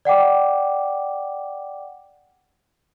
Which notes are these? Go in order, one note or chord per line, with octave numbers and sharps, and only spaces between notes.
D5 F#5 G5 D6